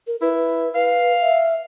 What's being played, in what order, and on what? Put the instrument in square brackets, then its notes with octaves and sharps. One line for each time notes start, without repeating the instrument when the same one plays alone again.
[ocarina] A#4
[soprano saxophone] E4 [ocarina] B4
[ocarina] B4 [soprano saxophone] F5
[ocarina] E5